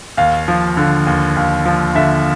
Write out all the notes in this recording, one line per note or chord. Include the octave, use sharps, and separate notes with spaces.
D#2 F5
F3
D3
D#2
D#2
F3
D3 E5